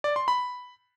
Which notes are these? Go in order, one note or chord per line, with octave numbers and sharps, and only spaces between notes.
D5
C6
B5